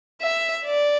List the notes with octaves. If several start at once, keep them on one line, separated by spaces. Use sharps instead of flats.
E5
D5